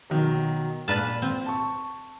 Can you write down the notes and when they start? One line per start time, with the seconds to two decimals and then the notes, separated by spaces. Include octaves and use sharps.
0.10 B2 D#3 F#3
0.88 A#2 B4 A5 F6
1.22 C4
1.46 A5 C#6